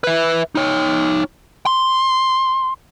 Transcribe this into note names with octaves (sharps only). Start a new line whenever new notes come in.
B4 E5
D#4 C#5
C6